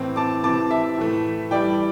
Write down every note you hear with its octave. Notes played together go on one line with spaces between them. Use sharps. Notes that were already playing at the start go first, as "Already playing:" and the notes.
Already playing: A2 E3 C4
A5 D6
C3 E3 C4 A5 D6
E5 A5
A2 E3 A3
E3 G3 E4 D5 G5